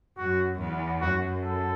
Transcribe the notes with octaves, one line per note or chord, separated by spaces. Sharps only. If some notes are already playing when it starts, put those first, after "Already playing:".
F#2 F#4
E2
F#2 F#4
A4